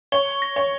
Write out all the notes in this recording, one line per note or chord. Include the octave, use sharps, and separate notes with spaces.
C#5 G7
A#6
C#5